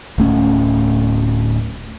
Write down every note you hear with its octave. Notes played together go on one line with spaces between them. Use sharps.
D1 A3 C#4